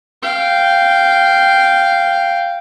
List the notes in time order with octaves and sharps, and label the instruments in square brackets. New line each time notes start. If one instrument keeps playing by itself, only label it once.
[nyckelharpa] F5 G5